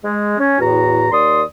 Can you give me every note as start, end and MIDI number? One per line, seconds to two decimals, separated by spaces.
0.03 0.34 56
0.38 0.59 61
0.59 1.10 40
0.59 1.10 45
0.59 1.10 66
0.59 1.10 82
1.12 1.42 39
1.12 1.42 74
1.12 1.42 84
1.12 1.42 87